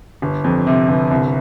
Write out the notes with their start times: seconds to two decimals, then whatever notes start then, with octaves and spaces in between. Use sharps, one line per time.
0.22 G1
0.44 F2
0.67 C3
0.89 G1
1.11 C2